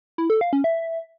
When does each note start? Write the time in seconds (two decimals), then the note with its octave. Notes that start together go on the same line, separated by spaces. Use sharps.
0.18 E4
0.30 A4
0.41 F5
0.53 C#4
0.64 E5